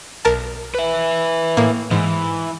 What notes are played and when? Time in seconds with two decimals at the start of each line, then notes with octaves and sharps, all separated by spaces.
0.25 B1 A#4 A5
0.75 B4 E5
1.57 A2 A#3
1.91 G#2 E3